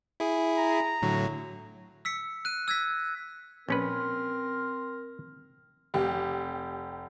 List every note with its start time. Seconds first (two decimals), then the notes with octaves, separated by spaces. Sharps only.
0.20 E4 G#4
0.58 A#5
1.02 A2 D3 F#3
2.05 E6 B6 C#7
2.45 F#6 D#7
2.68 E6 G#6 A#6 B6
3.69 A#1 C4 C#4 A#4 B4
5.94 F1 G4